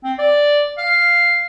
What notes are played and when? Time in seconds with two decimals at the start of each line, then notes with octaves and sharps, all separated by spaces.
0.04 C4
0.19 D5
0.78 F5